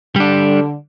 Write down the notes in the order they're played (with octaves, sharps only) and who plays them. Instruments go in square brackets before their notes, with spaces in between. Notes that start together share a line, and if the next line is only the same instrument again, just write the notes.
[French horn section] D3 [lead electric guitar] G3 D4